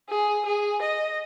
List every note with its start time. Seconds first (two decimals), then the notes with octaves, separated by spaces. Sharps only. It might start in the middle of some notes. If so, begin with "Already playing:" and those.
0.10 G#4
0.45 G#4
0.82 D#5